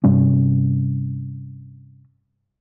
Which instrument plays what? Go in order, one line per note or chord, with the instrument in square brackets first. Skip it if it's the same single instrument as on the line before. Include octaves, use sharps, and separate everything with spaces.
[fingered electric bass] G2 C3 G3 C#4